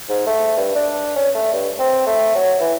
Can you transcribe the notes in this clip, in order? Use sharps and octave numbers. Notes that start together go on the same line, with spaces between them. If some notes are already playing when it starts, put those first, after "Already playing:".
G#2
A3
G2
D4
C#4
A3
G2
C4
A3
F#3
E3